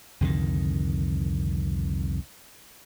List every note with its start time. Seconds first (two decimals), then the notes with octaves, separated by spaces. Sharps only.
0.21 C2 F2 D3 D#3